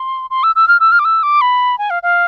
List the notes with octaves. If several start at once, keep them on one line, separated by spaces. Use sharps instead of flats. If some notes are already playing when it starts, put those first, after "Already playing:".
Already playing: C6
C6
E6
E6
F6
E6
F6
D6
E6
D6
B5
G#5
F5
F5